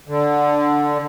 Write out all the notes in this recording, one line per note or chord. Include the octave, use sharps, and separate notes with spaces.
D3